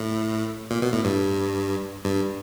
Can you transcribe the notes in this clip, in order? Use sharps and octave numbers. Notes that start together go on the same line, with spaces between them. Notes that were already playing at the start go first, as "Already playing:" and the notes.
Already playing: A2
A#2
B2
A2
G2
G2